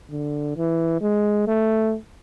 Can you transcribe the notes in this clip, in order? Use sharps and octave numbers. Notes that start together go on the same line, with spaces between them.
D3
E3
G#3
A3